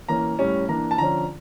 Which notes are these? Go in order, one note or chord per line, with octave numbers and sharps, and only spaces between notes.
E3 A#3 C#4 A#5
A2 G3 C#4
E3 A#3 D4 A#5
A5
D3 F3 C#4 A#5